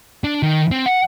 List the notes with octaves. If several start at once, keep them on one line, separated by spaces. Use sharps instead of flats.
D4
D#3
C4
F#5